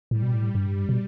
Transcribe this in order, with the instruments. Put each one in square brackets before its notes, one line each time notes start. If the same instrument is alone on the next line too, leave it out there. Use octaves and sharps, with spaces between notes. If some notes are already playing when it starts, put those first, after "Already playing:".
[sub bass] A2 [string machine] G3
[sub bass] B2
A2
G2
B2